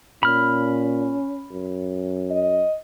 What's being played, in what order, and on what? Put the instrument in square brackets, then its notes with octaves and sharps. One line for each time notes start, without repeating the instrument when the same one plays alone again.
[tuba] A#2 [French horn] C#4 [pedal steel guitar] B5 F6
[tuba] F#2
[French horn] D#5